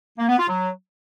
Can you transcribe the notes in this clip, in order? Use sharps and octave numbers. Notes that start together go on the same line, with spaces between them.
A#3
B3
F4
F#3